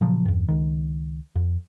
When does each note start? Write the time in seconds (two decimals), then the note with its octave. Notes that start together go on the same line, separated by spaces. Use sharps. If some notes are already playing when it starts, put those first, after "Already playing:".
0.01 A#2 C#3 F3 F#3
0.25 E2 G2
0.48 C#2 D#3
1.36 F2